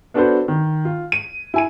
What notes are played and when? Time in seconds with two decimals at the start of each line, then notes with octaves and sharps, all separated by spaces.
0.14 B3 D4 F#4 A4 B4 C5
0.48 D#3
0.85 F4
1.12 D#7
1.54 E4 G#5 D#7